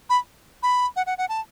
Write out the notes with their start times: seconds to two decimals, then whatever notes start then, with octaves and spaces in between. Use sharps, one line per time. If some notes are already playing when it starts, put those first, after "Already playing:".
0.10 B5
0.63 B5
0.96 F#5
1.06 F#5
1.18 F#5
1.29 A5